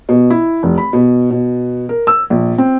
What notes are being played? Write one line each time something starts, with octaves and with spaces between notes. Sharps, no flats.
B2
E4
F1
B5
B2
B2
A#4
E6
A#1
C4